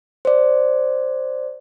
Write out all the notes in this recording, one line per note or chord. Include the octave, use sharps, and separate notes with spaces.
C5 D5